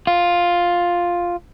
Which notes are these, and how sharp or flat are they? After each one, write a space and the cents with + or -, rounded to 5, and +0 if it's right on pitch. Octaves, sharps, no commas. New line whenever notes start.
F4 +5